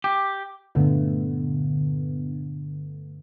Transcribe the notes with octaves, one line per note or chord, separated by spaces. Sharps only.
G4
G2 A#2 D3 A3 B3